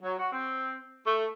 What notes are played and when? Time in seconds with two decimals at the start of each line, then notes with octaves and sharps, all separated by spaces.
0.03 F#3
0.18 F#4
0.31 C4
1.05 A3